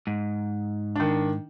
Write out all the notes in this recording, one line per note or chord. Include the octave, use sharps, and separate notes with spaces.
G#2
D#3 D4